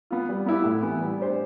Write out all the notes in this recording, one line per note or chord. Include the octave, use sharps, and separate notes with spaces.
B3 F4
G3
B3 E4 G4
A2
E3 B3
G3
D4 G4 C5